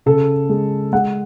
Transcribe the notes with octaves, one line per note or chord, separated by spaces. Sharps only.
C#3 A4
G#3
G#3 F#5